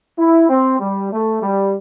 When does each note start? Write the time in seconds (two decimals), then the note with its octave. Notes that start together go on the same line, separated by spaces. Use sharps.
0.18 E4
0.49 C4
0.80 G3
1.12 A3
1.42 G3